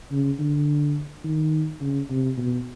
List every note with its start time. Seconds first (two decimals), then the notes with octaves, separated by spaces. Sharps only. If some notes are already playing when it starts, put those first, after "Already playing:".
0.12 C#3
0.39 D3
1.24 D#3
1.81 C#3
2.10 C3
2.38 B2